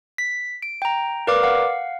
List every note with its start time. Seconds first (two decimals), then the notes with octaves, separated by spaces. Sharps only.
0.18 B6
0.62 D7
0.82 G5 A#5
1.27 A#4 B4 D5 F5 D6
1.43 F5 F#5